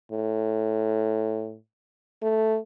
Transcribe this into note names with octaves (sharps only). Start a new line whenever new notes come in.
A2
A3